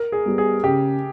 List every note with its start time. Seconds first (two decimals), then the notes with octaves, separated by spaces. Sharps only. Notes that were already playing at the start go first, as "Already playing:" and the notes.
Already playing: A#4
0.12 G#4
0.26 G3 B3 G4
0.38 G#4
0.64 C#3 G4